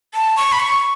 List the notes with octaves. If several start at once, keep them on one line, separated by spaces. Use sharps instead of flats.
A5
C#6
B5
C#6